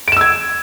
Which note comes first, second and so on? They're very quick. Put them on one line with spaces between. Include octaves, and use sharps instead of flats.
D7 E7 E6 G#6